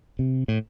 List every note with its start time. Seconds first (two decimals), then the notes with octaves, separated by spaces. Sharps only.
0.19 C3
0.48 A2